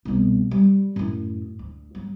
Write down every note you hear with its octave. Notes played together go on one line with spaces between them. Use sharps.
C2 B2
G3
F#2 A2
D2
F#3 G3